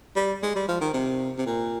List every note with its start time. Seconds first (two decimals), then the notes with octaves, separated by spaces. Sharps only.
0.16 G3
0.43 G#3
0.56 G3
0.68 F3
0.81 D#3
0.94 C3
1.38 C3
1.46 A#2